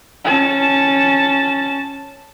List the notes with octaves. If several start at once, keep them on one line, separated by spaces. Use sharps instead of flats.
C#4 A5